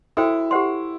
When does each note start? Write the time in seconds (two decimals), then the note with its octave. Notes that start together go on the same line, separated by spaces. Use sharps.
0.17 E4 F#4 A4 C5 G5
0.51 G4 C5 F#5 C6